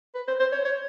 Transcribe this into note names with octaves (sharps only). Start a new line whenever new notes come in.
B4
C5
C5
C#5
C#5